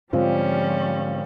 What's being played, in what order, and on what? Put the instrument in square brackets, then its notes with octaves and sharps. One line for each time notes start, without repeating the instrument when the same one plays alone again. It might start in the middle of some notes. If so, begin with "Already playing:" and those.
[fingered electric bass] G#2 D3 G#3 [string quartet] F3 G3 C#4 [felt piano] C4 F4